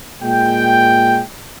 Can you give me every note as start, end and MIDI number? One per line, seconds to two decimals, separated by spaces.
0.21 1.22 46
0.21 1.22 56
0.21 1.22 79